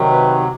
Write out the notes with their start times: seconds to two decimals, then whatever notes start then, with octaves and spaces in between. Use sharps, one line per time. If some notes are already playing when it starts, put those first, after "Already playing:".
Already playing: C3 D#3 F#3
0.10 B4